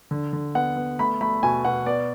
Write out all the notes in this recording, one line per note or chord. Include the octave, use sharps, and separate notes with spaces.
D3
D3
B3 F#5
B3
A3 B5
A3 B5
B2 G#5
B2 F#5
B3 D5